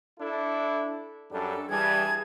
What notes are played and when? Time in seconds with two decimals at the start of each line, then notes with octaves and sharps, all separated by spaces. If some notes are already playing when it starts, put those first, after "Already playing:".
0.20 D4 E4 A4
1.31 F#2 G3 D4 A4
1.70 G2 E3 G3 G#4 A5 G#6